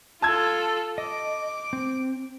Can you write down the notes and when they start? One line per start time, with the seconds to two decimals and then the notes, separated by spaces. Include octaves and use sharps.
0.22 F4 A4 A5 E6 G#6
0.98 D#5 D6
1.73 C4